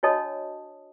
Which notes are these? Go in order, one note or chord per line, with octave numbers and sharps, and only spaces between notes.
D4 F#4 C#5 D#5 A5 D#6